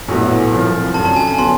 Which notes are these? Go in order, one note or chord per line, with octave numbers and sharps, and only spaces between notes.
A#1 A2 F#3 B3 E4
C2 C3 F3
F#2 D3 F#3 A5
A5
G#5
A5
D3 F#3 B3 C6